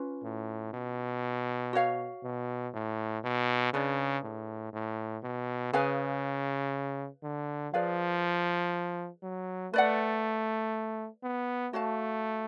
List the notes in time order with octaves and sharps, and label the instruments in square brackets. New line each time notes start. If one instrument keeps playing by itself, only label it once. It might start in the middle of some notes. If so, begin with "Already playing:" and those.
Already playing: [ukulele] C#4 F4 B4
[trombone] A2
B2
[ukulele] F#4 C#5 F5
[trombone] B2
A2
B2
[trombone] C#3 [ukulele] D4 G#4 B4 D5
[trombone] A2
A2
B2
[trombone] C#3 [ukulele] G#4 B4 F5 G#5
[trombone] D3
[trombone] F3 [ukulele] G#4 B4 D5 F5
[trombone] F#3
[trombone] A3 [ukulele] B4 D5 F#5
[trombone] B3
[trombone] A3 [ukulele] F#4 C#5 F5 A5